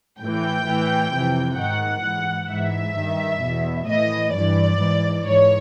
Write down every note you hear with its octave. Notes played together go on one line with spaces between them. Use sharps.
A2 E3 G5
A2 E3
F2 C3 E3
G#2 D#3 F#5
G#2 E3
G#2 E3 E5
G2 D#3
E2 B2
A2 E3 D#5
G2 E3 D5
G#2 E3
G#2 E3 C#5